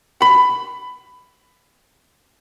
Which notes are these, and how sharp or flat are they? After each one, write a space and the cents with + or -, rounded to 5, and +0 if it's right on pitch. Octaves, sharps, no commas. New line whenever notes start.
B5 +20